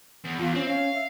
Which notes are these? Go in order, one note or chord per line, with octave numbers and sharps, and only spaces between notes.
E2
E2 F4
C4 C#4
C#4 F5
E5